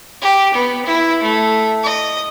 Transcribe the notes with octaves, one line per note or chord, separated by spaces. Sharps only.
G4
B3
E4
A3
D#5